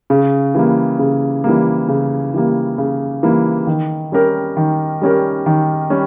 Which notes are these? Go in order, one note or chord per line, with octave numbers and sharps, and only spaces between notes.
C#3
E3 G3 A#3
C#3
E3 G3 A#3
C#3
E3 G3 A#3
C#3
E3 G3 A#3
D#3
G3 C#4 G4 A#4
D#3
G3 C#4 G4 A#4
D#3
G3 C#4 G4